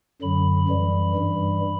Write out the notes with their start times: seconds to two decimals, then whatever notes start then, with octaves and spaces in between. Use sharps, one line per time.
0.22 F#2 D3 F#3 B5
0.69 F#2 E3 G3
1.15 G2 E3 G3